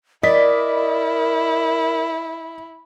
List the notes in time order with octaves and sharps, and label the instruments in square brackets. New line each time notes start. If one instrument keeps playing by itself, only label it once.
[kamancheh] E4 [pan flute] A#4 [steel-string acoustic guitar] D5 [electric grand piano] D#5 B6